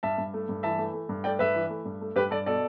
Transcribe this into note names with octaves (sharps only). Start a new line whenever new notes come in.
G2 E5 A5
G2
A3
G2
E3 E5 A5
A3
A3
G2
A3 D5 G5
G2 B4 E5
E3
A3
G2
A3
G2 G4 B4
G2 A4 D5
B2 A4 D5